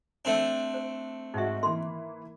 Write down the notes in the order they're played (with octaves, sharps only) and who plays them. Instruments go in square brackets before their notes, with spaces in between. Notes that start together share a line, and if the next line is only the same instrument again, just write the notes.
[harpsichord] A3 C4 D4 [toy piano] G#5
[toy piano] C5
[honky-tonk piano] G#2 F#4 [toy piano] D#4 E5
[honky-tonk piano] E3 A#3 [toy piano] C6